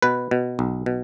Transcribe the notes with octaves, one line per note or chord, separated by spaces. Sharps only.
B2 B4
B2
B1
B2